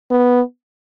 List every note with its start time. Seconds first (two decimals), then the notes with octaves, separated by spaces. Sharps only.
0.11 B3